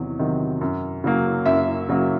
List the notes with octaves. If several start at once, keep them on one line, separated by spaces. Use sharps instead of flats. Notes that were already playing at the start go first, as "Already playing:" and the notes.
Already playing: E2 C3 D#3 F#3
C3 D#3 F#3
F#2
C#3 F#3 A#3
F#2 E5
C#3 F#3 A#3